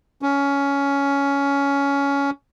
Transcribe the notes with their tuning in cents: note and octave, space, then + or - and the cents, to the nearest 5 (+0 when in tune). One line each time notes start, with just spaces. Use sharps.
C#4 +15